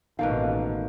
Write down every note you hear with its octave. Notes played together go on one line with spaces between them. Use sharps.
A1 B2 D#3 A#3 A4 B4 F5